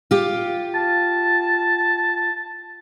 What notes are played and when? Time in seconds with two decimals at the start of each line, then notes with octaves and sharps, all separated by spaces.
0.11 F4 G4
0.75 A5